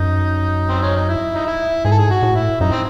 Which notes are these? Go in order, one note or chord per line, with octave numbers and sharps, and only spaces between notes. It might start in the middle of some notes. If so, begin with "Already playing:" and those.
Already playing: F#2 D#4
C4
C#4
D#4
E4
D#4
E4
G#2 G#4
A4
G#4
F#4
A2
E4
F#2 D#4
C4